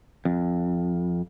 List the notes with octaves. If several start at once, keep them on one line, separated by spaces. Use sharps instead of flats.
F2